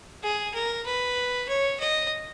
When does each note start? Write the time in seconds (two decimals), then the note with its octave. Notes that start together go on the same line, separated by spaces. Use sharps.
0.23 G#4
0.54 A#4
0.85 B4
1.48 C#5
1.80 D#5